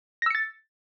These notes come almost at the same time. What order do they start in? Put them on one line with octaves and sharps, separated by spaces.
A#6 E6 C#7 A6